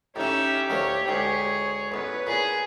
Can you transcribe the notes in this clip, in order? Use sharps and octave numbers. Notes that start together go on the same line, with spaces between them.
A2 A3 C#4 D#4 G4 E5
D2 A3 A#3 C#5
D2 G#2 G#4 C#5
A1 E2 B4 C#5
A#2 G#4